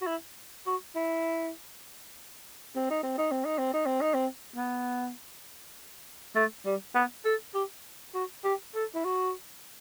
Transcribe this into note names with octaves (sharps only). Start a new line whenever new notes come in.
F#4
E4
F#4
E4
C4
D#4
C4
D#4
C4
D#4
C4
D#4
C4
D#4
C4
B3
A3
G3
B3
A4
G4
F#4
G4
A4
E4
F#4